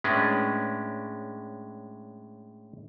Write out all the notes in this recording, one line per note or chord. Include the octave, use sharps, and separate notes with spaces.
A2 G#3 C#4 D4 B4